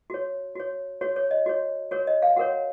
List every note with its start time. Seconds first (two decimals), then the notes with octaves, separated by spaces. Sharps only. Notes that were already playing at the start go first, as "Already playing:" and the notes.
0.10 F#4 C#5
0.55 F#4 C#5
1.01 F#4 C#5
1.16 C#5
1.31 D#5
1.46 F#4 C#5
1.91 F#4 A#4 C#5
2.07 D#5
2.22 F5
2.37 F#4 A#4 C#5 F#5